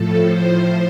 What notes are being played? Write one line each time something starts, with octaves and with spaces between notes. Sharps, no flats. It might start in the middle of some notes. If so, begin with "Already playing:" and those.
Already playing: A2 F3 A4
A2 F3 C5